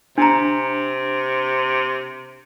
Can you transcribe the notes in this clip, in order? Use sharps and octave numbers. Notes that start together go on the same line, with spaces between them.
C3 D4 A#5